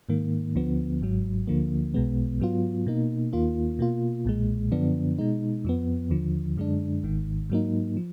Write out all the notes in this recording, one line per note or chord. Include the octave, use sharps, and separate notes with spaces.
G#2 D#3 A#3
D2 D3 F3 B3
G#1 G#2 F#3
D2 D3 F3 A#3
B1 B2 G#3 B3
G#2 F#3 B3 F4
B2 A#3 D#4
D#2 D#3 A#3 F4
B2 A#3 F4
B1 A#2 G#3
F#2 D3 F3 B3 D4
B2 G#3 D#4
F2 F3 B3
D#2 D3 F3
F#2 D3 G#3 D4
G#1 G#2 D#3
G#2 F#3 A#3 D#4
F3